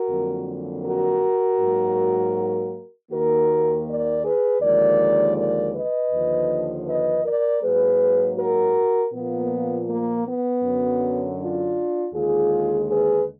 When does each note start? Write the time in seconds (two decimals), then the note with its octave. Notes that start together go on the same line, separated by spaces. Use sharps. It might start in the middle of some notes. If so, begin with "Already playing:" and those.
Already playing: F#4 A#4
0.10 F2 D3 F#3 A#3
0.85 F#4 A#4
1.61 G#2 F#3 A#3
3.11 D#2 D#3 A#3 F#4 A#4
3.86 A#4 D5
4.24 G#4 B4
4.62 D#2 D3 F3 G#3 A#4 D5
5.37 A#4 D5
5.74 B4 D#5
6.12 D#2 D3 F3
6.88 B4 D#5
7.25 A#4 D5
7.63 G#2 F#3 A#3 G#4 B4
8.38 F#4 A#4
9.14 A#2 F3 A#3 B3
9.89 A#3
10.27 B3
10.64 F#2 D3 F#3
11.40 D4 F4
12.14 D#2 D3 G#3 F4 G#4
12.90 G#4 B4